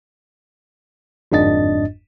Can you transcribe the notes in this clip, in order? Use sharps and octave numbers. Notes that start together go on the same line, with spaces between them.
G1 F2 G#2 D4 D#5 A6